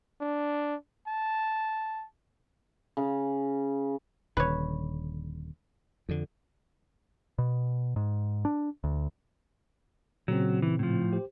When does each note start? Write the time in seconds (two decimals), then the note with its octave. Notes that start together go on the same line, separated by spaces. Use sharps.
0.21 D4
1.08 A5
2.97 C#3
4.37 D#1 D3 B4 C#5
6.09 F2 D3
7.38 B2
7.96 G#2
8.45 D4
8.84 D2
10.28 A#2 C#3 F#3 C4
10.62 E3
10.79 A2 F3
11.13 G4 C5